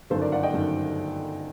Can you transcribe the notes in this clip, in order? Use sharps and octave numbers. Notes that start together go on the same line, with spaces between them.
G1 F#2 D#3 A4 C5
A#4 D5
D5 F#5
D#5 G5
G1 F#2 D#3